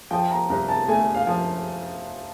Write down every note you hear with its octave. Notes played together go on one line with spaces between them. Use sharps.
F3 G5
A#5
C2 A#5
A5
A3 G#5
F5
F3